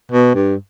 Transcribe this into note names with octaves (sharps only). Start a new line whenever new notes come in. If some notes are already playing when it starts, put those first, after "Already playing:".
B2
G2